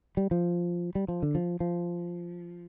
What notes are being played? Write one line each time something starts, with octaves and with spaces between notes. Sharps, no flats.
G3
F3
G3
F3
D3
F3
F3